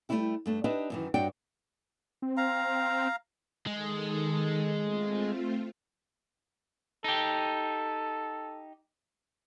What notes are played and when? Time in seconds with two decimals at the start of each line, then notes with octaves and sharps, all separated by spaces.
0.09 G3 A3 A#3 D#4 E4 G4
0.46 G2 A3 D4
0.64 D4 D#4 G4 B4 D#5 E5
0.90 F#2 D#3 E3
1.14 G2 D4 F#4 C#5 D5 G5
2.22 C4
2.37 F5 A#5
3.66 D#3 G#3 A4
4.81 A3 C4 F4
7.04 D#4 G4 A4